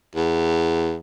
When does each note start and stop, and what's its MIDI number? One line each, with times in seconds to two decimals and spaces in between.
0.15 0.96 40